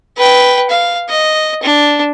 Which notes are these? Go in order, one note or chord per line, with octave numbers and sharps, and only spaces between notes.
B4 G5
F5
D#5
D4